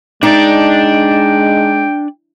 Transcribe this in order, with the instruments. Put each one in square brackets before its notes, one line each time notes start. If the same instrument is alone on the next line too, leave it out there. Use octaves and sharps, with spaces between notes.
[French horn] G#3 [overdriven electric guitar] D4 D5 [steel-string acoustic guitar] D#4 [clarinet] G5